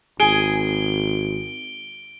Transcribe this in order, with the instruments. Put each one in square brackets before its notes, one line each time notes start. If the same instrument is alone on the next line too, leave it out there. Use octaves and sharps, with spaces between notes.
[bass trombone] G#1 [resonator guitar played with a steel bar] G#4 [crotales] D7 G7